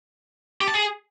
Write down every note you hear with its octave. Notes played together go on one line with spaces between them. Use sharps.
G4
A5
G#4